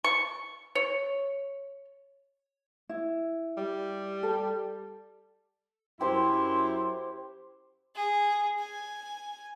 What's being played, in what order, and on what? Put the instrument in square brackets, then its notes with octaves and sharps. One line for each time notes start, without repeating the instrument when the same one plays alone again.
[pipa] C#6
C#5
[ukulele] E4
[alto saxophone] G3
[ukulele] A4
[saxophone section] F#2 E4 [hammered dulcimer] G4 C5 [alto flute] C6
[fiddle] G#4
G#5